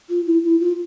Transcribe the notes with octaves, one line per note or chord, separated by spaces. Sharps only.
F4
E4
E4
F4